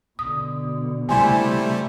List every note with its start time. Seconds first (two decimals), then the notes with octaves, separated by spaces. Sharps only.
0.19 B2 D3 D#6
1.09 C3 G3 A3 E4 G4 C5 G#5 C6